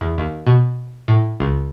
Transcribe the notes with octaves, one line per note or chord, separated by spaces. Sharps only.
E2
D#2
B2
A2
C#2